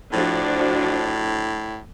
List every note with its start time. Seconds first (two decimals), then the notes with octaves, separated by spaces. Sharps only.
0.13 A2 F3 D4 F#4